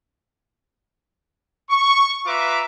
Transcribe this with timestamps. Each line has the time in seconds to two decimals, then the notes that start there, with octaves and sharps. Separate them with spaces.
1.70 C#6
2.27 F4 B4 E5 A#5 D6